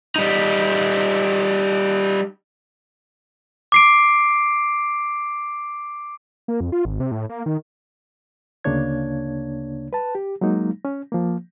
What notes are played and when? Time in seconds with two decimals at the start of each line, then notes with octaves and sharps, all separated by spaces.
0.16 G3 D#4
3.72 D6 C7 D7
6.48 A#3
6.61 F2
6.72 F4
6.85 G#1
7.00 C3
7.11 A2
7.29 A#3
7.46 D#3
8.64 D2 C#3 A#3 D4 C#5 G#6
9.93 B4 A5
10.15 G4
10.41 F#3 G#3 A#3 D#4
10.85 C#4
11.12 F3 A#3